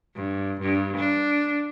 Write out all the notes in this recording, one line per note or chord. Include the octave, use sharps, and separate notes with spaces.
G2
G2
D4